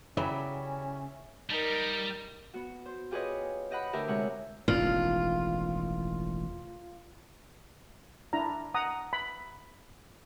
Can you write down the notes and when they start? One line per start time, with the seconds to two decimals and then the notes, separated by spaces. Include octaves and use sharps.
0.17 C#3 E3 F#3 G3 C#4 E5
1.50 G3 D#4 A#4
2.54 B3 F#4
2.86 C5
3.11 F4 G4 G#4 B4 C#5 D#5
3.70 G4 D#5 F#5 B5
3.93 D2 G4 A#4 E5 A#5
4.08 C3 G#3 C#5 F#5
4.68 E1 A1 D#3 F4
8.33 D4 E4 A#5
8.74 F#5 A#5 D#6
9.13 B5